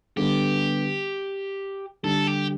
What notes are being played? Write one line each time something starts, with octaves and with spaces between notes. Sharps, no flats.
D3 G3 B3 G4
D3 G3 D4 A4
G4